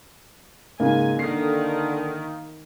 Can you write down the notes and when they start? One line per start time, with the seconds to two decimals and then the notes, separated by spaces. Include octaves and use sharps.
0.80 G#2 C#3 A#3 G#5
1.19 D3 D#3 C7